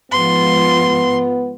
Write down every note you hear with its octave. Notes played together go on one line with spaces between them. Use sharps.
G#2 F3 B3 F4 C6